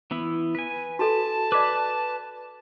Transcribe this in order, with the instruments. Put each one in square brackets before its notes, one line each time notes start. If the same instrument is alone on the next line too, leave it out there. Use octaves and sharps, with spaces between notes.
[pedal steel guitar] E3 B3 E4
B4 G#5
[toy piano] F#4 A4 [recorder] A5
[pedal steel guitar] B4 B5 [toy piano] D5 D6